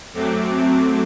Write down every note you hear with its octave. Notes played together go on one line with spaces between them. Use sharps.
F#2 F#3 A3 C4 D6